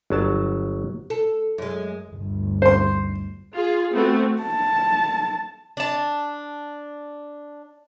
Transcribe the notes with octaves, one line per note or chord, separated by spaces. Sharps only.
G1 F#3 A5
A4
F#2 G#3
G1 D2
C5 C6
F4 G#4
A3 B3 C4 F#4
A5
D4 A5